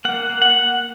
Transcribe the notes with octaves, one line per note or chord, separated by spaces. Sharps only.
A#3 F#5
A#3
F#5